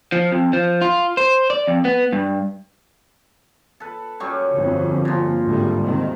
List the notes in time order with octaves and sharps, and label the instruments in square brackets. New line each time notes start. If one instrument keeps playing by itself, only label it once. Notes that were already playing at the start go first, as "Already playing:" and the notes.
[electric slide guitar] F3
F2
F3
F4
C5
D5
F2
B3
G2
[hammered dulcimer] A4 B4
F#2 G3 C#6
[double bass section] G1 F2
[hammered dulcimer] A#2 F3
[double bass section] G#1 D2 G3
C3 D#3